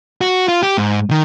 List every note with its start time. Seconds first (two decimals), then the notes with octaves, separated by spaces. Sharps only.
0.21 F#4
0.48 F4
0.63 G4
0.78 G#2
1.11 D#3